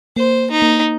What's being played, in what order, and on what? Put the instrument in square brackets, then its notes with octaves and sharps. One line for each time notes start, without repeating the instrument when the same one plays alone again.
[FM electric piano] A#3 [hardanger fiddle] C5
[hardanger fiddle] D#4
[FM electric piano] A#3